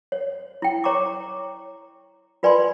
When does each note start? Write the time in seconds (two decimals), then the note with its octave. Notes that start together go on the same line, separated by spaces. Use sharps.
0.12 C#5
0.62 E4 G5
0.84 C#5 A#5 C#6 D6
2.43 F4 B4 D5 G#5 B5 C6